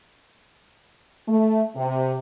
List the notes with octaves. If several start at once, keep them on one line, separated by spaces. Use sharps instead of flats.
A3
C3